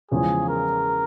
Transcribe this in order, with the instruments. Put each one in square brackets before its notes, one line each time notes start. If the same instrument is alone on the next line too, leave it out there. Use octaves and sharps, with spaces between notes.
[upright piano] E2 C#3 F3 G#3 [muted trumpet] G#4
[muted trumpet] A#4